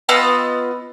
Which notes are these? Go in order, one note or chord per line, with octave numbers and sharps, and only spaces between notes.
B3 F4 D#5 E6